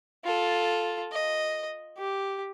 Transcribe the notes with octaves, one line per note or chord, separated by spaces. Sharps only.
F4 A4
D#5
G4